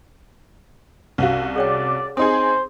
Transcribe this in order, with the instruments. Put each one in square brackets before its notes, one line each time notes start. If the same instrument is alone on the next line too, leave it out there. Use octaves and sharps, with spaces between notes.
[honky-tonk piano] C2 F#4 [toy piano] C#4 C5 F5
[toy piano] G#4 C#5 G5 [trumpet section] D5
[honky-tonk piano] C4 D#4 G#4 [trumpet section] C5 [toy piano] D#6